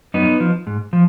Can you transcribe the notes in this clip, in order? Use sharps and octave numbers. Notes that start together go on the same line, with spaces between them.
F#2 B3 D#4
F3
G#2
F3